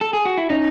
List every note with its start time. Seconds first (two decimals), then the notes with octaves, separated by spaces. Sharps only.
0.01 A4
0.13 G#4
0.25 F#4
0.38 E4
0.50 C#4 D#4